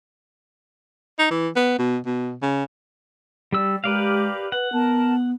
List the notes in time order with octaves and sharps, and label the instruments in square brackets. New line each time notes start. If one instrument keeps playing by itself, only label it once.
[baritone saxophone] D#4
E3
B3
B2
B2
C#3
[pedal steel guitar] G3 G4 E6 [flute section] D5
[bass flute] G#3 [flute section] G4 A#4 [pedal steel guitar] B4 D5 F5
[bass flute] B4 [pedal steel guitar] F#5
[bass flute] B3 [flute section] A#4 A5